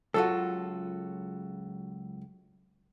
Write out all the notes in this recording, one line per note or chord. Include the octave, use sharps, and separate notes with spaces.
C#2 F#3 F4 F#4 A4